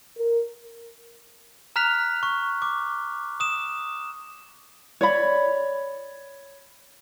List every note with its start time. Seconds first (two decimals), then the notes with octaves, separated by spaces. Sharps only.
0.18 A#4
1.76 A#5 F6 F#6 B6 F7
2.23 C#6
2.62 D6
3.40 D#6 E7
5.01 C#5 D5 B5